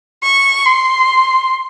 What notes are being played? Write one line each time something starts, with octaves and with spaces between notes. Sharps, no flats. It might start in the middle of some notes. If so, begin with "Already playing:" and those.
C#6
C6